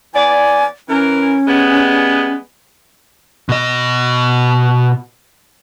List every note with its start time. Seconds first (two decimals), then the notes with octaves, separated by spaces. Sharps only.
0.14 E3 B3 D5 G#5
0.89 E3 C#4 A#4
1.47 G3 G#3 B3
3.49 B2 D#5